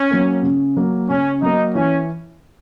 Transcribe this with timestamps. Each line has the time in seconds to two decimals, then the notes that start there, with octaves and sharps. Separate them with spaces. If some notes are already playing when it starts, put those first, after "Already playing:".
Already playing: C#4
0.11 F#3 A#3
0.43 C#3
0.77 F#3 A#3
1.09 C#3 C#4
1.42 F#3 A#3 D#4
1.75 E3 C#4